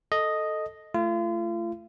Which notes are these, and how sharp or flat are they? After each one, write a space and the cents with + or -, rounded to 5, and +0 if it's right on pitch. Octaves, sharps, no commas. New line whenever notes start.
A4 +0 D#5 +0
A3 +0 F4 -40